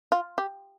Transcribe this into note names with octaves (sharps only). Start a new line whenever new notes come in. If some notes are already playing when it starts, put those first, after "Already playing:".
F4
G4